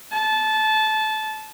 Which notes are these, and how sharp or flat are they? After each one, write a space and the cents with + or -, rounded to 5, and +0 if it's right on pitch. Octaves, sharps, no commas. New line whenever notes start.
A5 -20